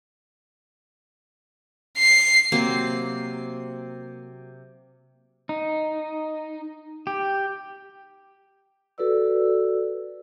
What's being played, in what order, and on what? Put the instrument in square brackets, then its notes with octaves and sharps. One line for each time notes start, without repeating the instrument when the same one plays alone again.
[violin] C7
[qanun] C3 F#3 A#3 C4
[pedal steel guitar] D#4
G4
[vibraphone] F#4 A4 B4 D5 E6